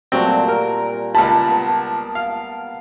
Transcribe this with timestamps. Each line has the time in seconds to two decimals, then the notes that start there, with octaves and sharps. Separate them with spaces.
0.12 A#2 F#3 G3 A3 C4
0.48 A#4 A#5
1.15 C#2 A#2 A5 B5
1.48 B3 A#4
2.15 F5